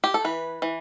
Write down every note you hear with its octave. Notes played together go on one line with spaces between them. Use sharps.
G4
A4
E3 B4
E3